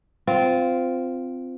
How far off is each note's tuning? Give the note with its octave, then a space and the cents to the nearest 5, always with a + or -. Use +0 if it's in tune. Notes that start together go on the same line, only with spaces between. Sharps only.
C4 -15 F4 +0